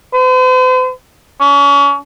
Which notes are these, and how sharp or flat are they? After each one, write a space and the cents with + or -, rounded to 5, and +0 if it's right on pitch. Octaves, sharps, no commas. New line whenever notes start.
C5 -45
C#4 +35